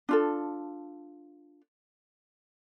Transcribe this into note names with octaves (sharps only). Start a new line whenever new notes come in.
D4 F4 A4